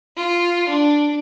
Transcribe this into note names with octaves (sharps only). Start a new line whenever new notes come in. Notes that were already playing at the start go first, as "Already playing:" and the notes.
F4
D4